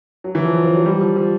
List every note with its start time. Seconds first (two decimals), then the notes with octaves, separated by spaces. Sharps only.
0.24 F#3
0.35 E3
0.45 F3
0.55 F3
0.65 F3
0.75 F#3
0.86 G3
1.01 F3
1.16 F3